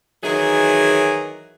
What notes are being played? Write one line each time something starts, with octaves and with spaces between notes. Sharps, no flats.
D#3 E3 F#3 F#4 G#4